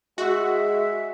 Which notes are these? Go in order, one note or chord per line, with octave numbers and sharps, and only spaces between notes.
G#3 F#4 E5